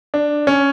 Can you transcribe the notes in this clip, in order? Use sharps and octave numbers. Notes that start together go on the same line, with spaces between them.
D4
C#4